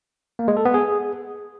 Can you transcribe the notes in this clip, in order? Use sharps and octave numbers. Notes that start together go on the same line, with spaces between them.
A#3
G#3
A4
B3
G#4